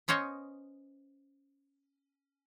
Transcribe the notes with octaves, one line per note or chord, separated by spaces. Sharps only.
B3 C#4 C5 C#5 D#5